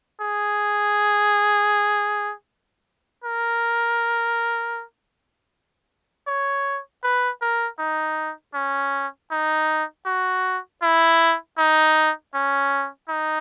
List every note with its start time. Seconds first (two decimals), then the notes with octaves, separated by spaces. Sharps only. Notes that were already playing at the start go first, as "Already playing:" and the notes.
0.21 G#4
3.24 A#4
6.28 C#5
7.04 B4
7.42 A#4
7.79 D#4
8.55 C#4
9.31 D#4
10.06 F#4
10.83 E4
11.58 D#4
12.35 C#4
13.10 D#4